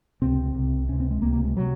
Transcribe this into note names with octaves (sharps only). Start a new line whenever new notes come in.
C#2 C3 C4
C2 C3
C#2 C3 C#4
C4
G#3
C#2 C3 A#3
A#3
G#3
C3 F#3